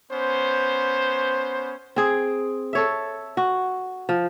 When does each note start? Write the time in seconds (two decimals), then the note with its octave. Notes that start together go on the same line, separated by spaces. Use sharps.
0.12 B3 C#4 C5
1.96 C4 G#4
2.73 A4 C#5 E5
3.37 F#4
4.09 F3